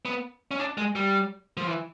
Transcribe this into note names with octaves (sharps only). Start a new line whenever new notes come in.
B3
C#4
D4
G#3
G3
F3
E3